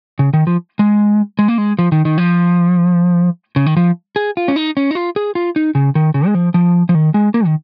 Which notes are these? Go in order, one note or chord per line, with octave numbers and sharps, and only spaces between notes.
C#3
D#3
F3
G#3
G#3
A#3
G#3
F3
D#3
D#3
F3
C#3
D#3
F3
G#4
F4
C#4
D#4
C#4
D#4
F4
G#4
F4
D#4
C#3
D#3
C#3
G#3
F3
F3
F3
D#3
G#3
A#3
D#3